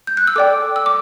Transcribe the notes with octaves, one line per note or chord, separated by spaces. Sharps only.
G6
F#6
E6
A4 D5 G5 D6
E6
D6